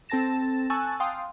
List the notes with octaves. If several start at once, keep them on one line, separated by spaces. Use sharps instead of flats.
C4 A4 A5 A6 A#6 E7
G#5 A5 C#6 E6 F#6 A6
F5 G5 C6 D#6